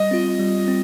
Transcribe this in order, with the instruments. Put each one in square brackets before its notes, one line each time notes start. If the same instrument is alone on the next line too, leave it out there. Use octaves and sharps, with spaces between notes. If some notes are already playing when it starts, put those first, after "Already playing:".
Already playing: [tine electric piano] G3 [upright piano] D#5
[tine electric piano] C4 F4
G3
C4